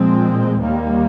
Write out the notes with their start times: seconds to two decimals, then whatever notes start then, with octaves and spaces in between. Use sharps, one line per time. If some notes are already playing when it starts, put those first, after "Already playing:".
Already playing: A#2 F3 G#3 C4
0.59 D#2 D#3 G3 A#3